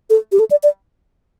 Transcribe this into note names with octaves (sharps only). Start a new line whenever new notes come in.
A4
G4
A4
D5
D5